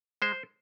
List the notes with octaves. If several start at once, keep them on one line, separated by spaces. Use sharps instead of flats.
G#3 C5